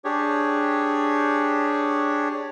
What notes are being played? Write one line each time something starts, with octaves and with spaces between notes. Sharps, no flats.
D4 G4 G#4 C#5